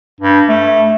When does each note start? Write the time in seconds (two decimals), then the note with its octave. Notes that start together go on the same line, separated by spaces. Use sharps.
0.20 G2
0.49 A3